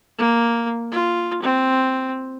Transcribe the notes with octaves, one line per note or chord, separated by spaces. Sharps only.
A#3
F4
C4